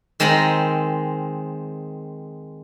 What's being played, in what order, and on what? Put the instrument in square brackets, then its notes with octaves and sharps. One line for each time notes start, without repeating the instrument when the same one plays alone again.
[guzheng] D#3 G#3 C4 A#5 B5